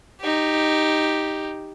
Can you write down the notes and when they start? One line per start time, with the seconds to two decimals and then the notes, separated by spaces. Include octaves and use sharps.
0.21 D#4 G4